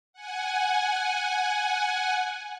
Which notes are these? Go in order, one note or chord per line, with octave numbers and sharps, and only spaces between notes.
F#5 G#5